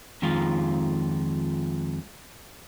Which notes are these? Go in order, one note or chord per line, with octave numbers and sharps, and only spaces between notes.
F2 D#3 G#3 F4 F5